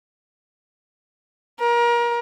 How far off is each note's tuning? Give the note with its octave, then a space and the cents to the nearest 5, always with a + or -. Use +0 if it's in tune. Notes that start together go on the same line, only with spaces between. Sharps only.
A#4 +30